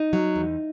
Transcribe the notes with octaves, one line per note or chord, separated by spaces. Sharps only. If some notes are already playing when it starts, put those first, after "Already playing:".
Already playing: D#4
F#3
E2